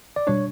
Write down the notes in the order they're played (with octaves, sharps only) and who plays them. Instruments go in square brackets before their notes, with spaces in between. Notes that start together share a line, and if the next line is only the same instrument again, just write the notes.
[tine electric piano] D5
[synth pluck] B2 G3 D4 [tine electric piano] C#5